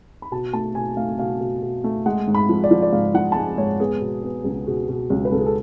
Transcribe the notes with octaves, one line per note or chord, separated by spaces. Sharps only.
B5
B2 A5
A3 A5
B2 G#5
A3 F5
B2 F5
B2
B2
A3
G#3 F#5
G#2
B5
F3
D5
F3
D5
G#2 F5
F3 F#5
A5
G#3 G#5
G#2 C#5
B3 G#4
B2
B3
C#2
B2 G#4
B2
C#2
B4
C#2 A4
G#4
A4